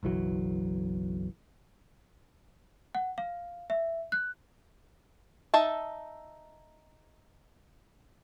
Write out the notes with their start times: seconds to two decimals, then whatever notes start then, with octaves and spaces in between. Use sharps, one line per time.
0.03 F#1 B1 E3 F#3
2.95 F#5
3.18 F5
3.70 E5
4.12 F#6
5.54 D#4 E5 A5